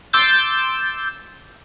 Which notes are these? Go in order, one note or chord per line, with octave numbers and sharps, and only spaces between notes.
C6 D6 E6 G6 A6